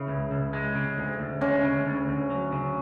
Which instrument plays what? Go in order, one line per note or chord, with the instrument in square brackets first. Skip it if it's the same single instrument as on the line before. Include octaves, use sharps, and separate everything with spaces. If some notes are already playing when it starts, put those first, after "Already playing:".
Already playing: [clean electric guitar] C#3 [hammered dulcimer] E4
[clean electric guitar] C#2
C#2
G#3
C#3
D2
D2
[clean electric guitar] G#3 [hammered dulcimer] C#4
[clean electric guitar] C#3
D2
D2
F#3
C#3